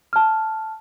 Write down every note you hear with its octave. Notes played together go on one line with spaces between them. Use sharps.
A5 F6